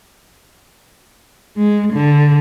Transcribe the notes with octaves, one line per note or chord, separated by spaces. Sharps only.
G#3
D3